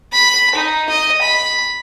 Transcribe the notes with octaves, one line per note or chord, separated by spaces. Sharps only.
B5
D#4
D#5
B5